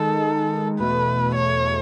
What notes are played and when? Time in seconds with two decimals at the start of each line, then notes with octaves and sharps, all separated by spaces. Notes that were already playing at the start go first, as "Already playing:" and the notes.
Already playing: D#3 G#3 D#4 A4
0.79 E2 B2 A3 B4
1.36 C#5